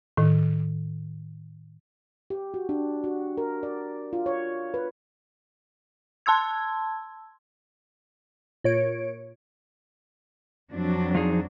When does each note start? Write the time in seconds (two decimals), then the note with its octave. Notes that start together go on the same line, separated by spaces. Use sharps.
0.17 A2 D#3
2.30 G4
2.54 F#4
2.69 D4
3.04 F#4
3.38 A#4
3.63 D5
4.13 F4
4.26 C#5
4.74 B4
6.26 A5 C6 E6 G#6
8.64 A#2 C#5 D7
10.73 F2 F#3 D4
11.15 F3 D#4 G#4